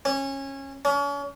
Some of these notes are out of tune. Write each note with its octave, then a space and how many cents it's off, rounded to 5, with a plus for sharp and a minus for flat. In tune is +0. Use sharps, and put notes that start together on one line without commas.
C#4 -20
C#4 +40